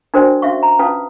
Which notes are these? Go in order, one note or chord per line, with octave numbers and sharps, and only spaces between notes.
D4 F#4 A#4 C5 D5 G5
C#4 F#4 E5 F5 C#6
A#5
C#4 F4 B4 F5 A5 D#6